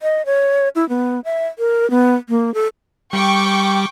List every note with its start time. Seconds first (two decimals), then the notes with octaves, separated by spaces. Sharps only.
0.02 D#5
0.26 C#5
0.76 E4
0.89 B3
1.25 E5
1.59 A#4
1.90 B3
2.29 A#3
2.54 A4
3.13 G3 G5 C#6 D6